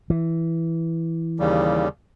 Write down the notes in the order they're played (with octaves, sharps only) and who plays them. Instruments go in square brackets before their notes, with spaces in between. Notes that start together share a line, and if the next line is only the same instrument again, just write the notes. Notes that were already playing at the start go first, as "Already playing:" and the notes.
[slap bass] E3
[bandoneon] D#2 C#3 G3